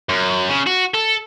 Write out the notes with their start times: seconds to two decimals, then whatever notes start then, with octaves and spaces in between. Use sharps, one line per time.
0.09 F#2
0.49 C#3
0.67 F#4
0.94 A4